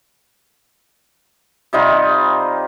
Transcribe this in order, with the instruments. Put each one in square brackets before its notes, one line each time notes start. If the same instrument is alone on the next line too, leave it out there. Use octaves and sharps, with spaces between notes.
[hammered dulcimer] C3 G3 D#4 F4